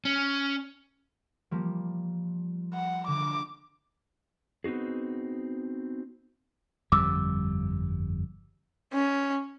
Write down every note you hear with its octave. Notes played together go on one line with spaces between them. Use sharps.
C#4
F3 G3 A#3
F#5
D3 D6
B3 C4 D#4 F#4 G#4
G1 F2 G3 D6 E6
C#4